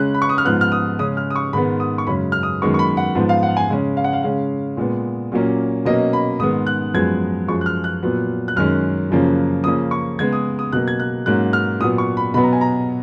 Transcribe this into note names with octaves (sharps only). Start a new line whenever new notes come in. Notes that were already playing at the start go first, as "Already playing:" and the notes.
Already playing: C#3 G#3 C#4 F#6
B5
C#6
D#6
F6
G#2 F3 B3 F#6
F6
D#6
C#3 G#3 C#4 D#6
F6
D#6
C#6
G#2 D#3 G#3 B3 B5
D#6
C#6
F#2 C#3 G#3 C#4 B5
F6
D#6
F#2 D#3 G#3 B3 C#6
C#6
B5
F#5
G#2 F3 B3
F5
F#5
G#5
C#3 G#3 C#4
F5
F#5
F5
C#3 G#3 C#4 F5
A#2 G#3 B3
A#2 F#3 A#3 C#4
B2 F#3 A#3 C#4 D#5
B5
G#2 D#3 G#3 B3 D#6
F#6
F#2 F3 G#3 B3 G#6
F#2 F3 G#3 C#6
F#6
F6
F#6
A#2 F#3 B3
F#6
F#2 D#3 G#3 C#4 F6
F#2 C#3 F3 A#3 C#4
C#3 F3 A#3 C#4 D#6
C#6
C#3 G#3 B3 G#6
D#6
D#6
B2 F#3 A#3 F#6
G#6
F#6
G#2 F#3 A#3 C#4 F#6
F6
A#2 F#3 B3 D#6
C#6
B5
B2 F#3 B3 B5
A#5
G#5
A#5